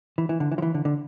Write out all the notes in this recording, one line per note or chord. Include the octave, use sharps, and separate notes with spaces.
E3
E3
D3
E3
F3
E3
D3
D3